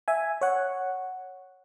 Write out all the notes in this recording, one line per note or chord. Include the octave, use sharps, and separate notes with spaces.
E5 G#5
C#5 F#5